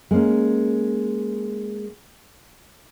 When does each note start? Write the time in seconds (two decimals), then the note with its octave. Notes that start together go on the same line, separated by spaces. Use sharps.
0.11 G#3 A#3 C#4